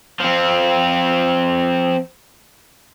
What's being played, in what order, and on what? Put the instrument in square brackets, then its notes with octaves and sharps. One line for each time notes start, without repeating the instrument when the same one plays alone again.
[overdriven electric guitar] F3 C4